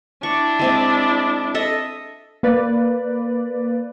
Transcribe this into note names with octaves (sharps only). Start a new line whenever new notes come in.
D4 E4 C#6
G#3 C4 E5
A4 D#5 E5
A#3 B4 D5